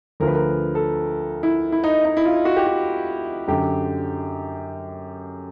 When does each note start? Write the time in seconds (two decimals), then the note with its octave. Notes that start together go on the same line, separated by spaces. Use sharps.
0.20 D2 D3 F3 A#4
0.28 B4
0.35 A#4
0.75 A4
1.43 E4
1.72 E4
1.84 D#4
2.05 D#4
2.17 E4
2.25 F4
2.45 F#4
2.56 G4
2.66 F#4
3.48 F#2 D3 F#3 G4